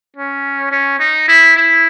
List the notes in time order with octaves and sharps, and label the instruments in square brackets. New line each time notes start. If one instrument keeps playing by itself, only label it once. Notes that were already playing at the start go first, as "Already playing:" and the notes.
[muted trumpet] C#4
C#4
D#4
E4
E4